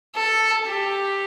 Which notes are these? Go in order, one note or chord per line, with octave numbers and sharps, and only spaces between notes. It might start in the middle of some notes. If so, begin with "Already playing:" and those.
A4
G4